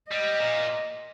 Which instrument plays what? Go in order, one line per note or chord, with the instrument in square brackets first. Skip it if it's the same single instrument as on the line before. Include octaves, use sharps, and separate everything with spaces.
[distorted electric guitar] G3 [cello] D#5
[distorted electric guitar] A#2